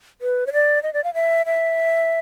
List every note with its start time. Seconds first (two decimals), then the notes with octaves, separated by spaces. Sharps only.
0.21 B4
0.47 C#5
0.53 D5
0.83 D#5
0.94 D5
1.04 F5
1.14 E5
1.46 E5